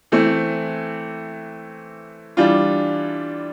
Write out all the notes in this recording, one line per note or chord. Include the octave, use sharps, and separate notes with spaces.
E3 A3 C4
E3 G3 D4 F4